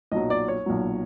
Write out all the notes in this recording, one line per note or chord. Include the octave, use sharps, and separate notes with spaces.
B1 A#2 F#3 D#5
D5
C#5
B1 A#2 F#3